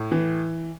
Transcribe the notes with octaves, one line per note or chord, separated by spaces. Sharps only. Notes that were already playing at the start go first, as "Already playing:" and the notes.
Already playing: A2
E3